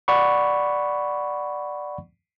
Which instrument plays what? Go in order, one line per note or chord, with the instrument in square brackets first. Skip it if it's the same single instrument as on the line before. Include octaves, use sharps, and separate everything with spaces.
[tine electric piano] D5 F#5 B5 C#6